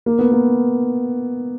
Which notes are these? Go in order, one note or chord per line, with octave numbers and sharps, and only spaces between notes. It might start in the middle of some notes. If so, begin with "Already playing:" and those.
A#3
B3
A#3